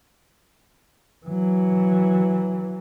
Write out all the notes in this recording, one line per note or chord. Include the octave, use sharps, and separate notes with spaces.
E3 F#3